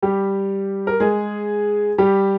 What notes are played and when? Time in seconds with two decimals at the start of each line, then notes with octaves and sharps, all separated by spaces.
0.02 G3 G4
0.87 A#4
1.00 G#3 G#4
1.98 G3 G4